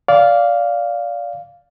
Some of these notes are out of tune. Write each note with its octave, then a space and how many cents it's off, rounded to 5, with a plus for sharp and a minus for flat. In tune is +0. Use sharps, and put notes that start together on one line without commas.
D5 -20 F5 +0